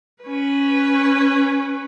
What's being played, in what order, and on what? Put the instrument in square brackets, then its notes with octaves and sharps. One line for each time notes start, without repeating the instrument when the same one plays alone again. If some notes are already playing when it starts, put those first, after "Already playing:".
[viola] C#4 B4